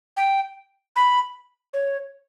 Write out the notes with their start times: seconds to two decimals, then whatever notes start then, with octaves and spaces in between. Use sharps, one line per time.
0.17 G5
0.96 B5
1.74 C#5